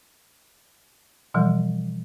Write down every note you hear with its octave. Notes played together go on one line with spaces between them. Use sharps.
B2 E3 F3 G3